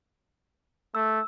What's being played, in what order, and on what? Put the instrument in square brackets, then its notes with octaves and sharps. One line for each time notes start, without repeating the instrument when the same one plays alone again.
[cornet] A3 [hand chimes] E6